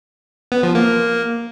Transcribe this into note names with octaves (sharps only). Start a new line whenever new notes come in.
B3
F3
A#3
A#3